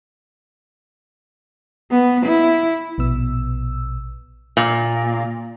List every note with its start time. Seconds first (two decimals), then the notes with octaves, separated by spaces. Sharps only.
1.91 B3
2.26 E4
2.98 A#1 B2 B3 E6
4.57 A#2